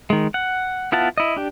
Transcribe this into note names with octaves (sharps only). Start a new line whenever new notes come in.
D#3 G#3
F#5
B3 E4 F4 F#5 A5
E4 D#5
D4 G4